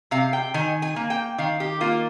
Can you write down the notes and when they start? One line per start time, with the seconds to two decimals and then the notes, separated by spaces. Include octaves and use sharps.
0.11 C3 F5
0.33 G5
0.54 D#3 G#5
0.82 G#5
0.96 A#3
1.10 G5
1.38 D#3 F5
1.60 G4
1.81 A#3 F4